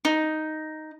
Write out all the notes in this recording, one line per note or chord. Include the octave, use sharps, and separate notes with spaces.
D#4